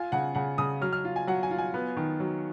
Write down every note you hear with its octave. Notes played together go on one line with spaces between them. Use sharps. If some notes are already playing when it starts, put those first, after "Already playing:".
Already playing: F4 G#5
C#3 F#5
C#3 F#5
C#3 D#6
F#3 F6
F6
F4
G#5
F#3 F#5
G#5
F4
G#5
B3
D#3
F#3